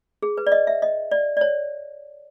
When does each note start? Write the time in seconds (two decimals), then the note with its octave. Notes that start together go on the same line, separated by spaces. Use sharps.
0.23 G#4
0.38 B4
0.47 D5
0.52 D#5
0.67 E5
0.82 D#5
1.12 D5
1.37 D5
1.41 C#5